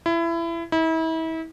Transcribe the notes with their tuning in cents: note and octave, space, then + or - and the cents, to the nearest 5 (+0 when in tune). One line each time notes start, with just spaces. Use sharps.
E4 +25
E4 -35